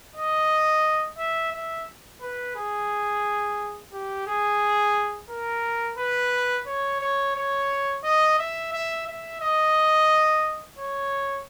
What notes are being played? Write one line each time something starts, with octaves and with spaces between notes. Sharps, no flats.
D#5
E5
E5
B4
G#4
G4
G#4
A#4
B4
C#5
C#5
C#5
D#5
E5
E5
E5
D#5
C#5